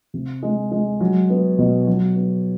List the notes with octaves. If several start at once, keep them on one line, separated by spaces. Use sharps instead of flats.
C3
G#3
G#3
F#3
B3
B2
F#3
B3